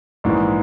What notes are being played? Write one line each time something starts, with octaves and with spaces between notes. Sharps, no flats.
A#1 G#2 E3